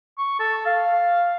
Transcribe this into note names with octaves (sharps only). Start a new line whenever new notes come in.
C#6
A4
F5